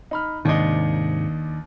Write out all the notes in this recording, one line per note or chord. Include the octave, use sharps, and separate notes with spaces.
D#4 B5 F6
D#2 G#2 C3 D#3 D4 D#5